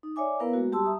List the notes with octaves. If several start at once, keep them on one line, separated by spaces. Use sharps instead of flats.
D#4
C#5 D5 E5 G#5 D6
B3 E4 A#4 B4 F5 A#5
G#3 A#3 F#4
G3 G4 A5 C6 E6
E5 A#5 D#6